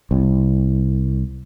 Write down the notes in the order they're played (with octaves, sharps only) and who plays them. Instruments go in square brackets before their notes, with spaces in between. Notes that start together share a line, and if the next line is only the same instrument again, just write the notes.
[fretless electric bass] C2